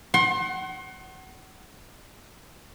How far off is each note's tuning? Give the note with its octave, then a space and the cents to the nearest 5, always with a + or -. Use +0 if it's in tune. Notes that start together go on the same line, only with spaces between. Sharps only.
F#5 +30 C6 +35